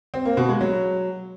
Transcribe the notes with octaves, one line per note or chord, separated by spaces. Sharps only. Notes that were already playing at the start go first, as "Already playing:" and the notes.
C4
A#3
B2
G#3
F#3